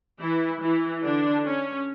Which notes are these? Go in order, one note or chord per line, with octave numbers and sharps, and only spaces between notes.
E3 E4
E3 E4
D3 D4
C#4